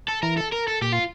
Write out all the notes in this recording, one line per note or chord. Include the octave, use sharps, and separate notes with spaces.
A4
E3 A#4
A4
A#4
A4
A#2 G4
F4